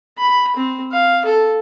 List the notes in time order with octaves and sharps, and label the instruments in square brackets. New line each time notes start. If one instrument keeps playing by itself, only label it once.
[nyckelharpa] B5
C4
F5
A4